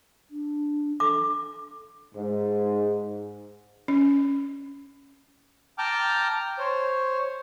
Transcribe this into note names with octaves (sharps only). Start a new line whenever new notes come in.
D4
A4 D6
G#2
C#4
G5 A5 A#5 D6 F6 G6
C5 C#5